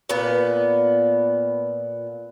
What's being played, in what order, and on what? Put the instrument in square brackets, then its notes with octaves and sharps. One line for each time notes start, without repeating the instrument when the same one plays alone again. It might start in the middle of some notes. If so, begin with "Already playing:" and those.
[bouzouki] A#2 B3